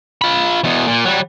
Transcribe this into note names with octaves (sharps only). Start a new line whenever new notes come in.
F4 B5
E2 B2
A#2
F#3 G3